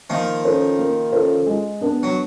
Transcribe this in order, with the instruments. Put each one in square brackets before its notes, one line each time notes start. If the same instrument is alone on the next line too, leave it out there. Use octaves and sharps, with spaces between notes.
[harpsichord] D#3 F3 [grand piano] A#3
[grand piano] C#4 F4 A4 C5
A#3
C#4 F4 A4 C5
G#3
B3 D4
[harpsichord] F#3